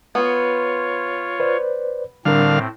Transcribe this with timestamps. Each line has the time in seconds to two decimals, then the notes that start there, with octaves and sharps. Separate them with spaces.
0.15 B3 F4 C#5
1.40 B4 C5 D5
2.25 A2 D3 G3 C4 D4 A#4 F5